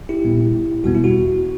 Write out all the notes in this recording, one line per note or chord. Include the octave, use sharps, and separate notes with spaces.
E4 G4
A#2 G3 B3
E2 B2 G3 B3 F#4
E4
F#4